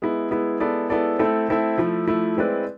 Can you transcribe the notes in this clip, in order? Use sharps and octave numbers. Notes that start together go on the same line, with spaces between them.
G#3 B3 E4
G#3 B3 E4
G#3 B3 E4 A4 D5
G#3 B3 E4 A4 D5
A3 C4 E4 A4 E5
A3 C4 E4 A4 E5
F3 A3 E4
F3 A3 E4
G#3 C4 E4 B4 D5